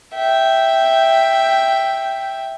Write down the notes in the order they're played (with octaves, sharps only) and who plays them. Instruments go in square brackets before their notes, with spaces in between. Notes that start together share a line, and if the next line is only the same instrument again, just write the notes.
[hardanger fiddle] E5 G5